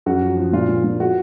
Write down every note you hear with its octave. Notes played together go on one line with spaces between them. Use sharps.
F#2 F#4
F3
F3
A#2 F4
A#2
A#2
F#4